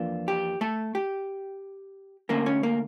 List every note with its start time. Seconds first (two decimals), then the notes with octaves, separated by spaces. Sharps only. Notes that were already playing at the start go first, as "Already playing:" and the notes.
Already playing: F2 E3 A#3 D4 F4
0.28 G4
0.61 A3 A4
0.95 G4
2.29 D3 A3 A#3 C#4 A#4
2.46 C#4 C#5
2.63 A#3 A#4